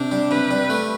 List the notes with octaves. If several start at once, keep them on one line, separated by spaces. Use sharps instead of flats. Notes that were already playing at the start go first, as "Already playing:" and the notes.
Already playing: C3 D4
G3
C3 B4
G3
A3